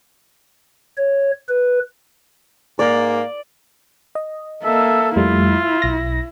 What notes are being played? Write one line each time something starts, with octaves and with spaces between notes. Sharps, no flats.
C#5
B4
G#2 A#3 D5
D#5
A#3 A4 E5
F2 G3 A3 E4 F4
B1 A#6